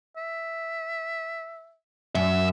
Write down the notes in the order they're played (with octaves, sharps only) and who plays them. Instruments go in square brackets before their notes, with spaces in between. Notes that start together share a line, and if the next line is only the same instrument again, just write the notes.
[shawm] E5
[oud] F#2 [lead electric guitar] E5